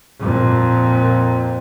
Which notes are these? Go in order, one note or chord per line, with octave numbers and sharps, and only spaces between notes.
F2 A#2